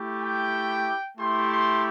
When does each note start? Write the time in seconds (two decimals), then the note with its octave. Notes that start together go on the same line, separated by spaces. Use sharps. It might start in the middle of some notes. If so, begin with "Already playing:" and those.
Already playing: A3 E4 G4
0.22 G5
1.18 A3 E4 G4 C6
1.50 C6